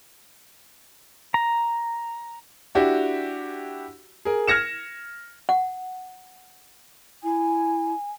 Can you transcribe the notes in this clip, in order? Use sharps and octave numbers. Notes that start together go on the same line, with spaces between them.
A#5
D4 E4 F#4 G4
G#4 A#4
F6 G#6 A#6 C#7 E7
F#5
E4 G#5